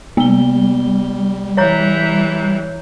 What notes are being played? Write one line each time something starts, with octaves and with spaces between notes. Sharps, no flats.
C3 G3 G#3 A#3 B3 G7
E3 C#5 A#5 G6